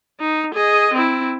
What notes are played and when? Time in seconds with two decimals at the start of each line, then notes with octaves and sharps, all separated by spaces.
0.20 D#4
0.54 G#4 D#5
0.94 C4 E4